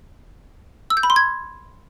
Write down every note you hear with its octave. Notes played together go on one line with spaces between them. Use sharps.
E6
G6
B5
C6
G#6